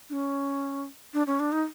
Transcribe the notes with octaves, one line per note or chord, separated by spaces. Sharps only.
D4
C#4
D4
C#4
D4
D#4